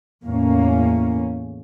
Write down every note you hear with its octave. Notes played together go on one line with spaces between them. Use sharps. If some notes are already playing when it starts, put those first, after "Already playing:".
E2 A2 A#3 C#4